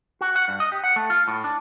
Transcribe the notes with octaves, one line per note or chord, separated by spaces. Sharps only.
F#4
F#5
G2
D#5
G4
F#5
A3
F4
A2
D4